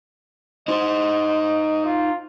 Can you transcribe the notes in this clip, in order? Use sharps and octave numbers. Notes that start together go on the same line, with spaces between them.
D#4 C5 D#5
F4